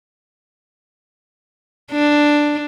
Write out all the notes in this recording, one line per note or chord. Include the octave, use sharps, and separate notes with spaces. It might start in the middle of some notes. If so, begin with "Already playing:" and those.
D4